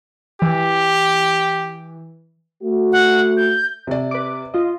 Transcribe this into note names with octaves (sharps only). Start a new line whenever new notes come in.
E3 G4
A3 F#4
F#5
G6
C3 D5
B4 D6
F4 D#5